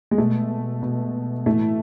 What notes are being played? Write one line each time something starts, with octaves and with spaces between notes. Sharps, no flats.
G#3
B2 A3
B2
A2 E3 A3